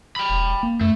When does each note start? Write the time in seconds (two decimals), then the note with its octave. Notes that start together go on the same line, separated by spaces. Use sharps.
0.16 G5 B5
0.29 E1
0.63 A#3
0.81 F#2 A3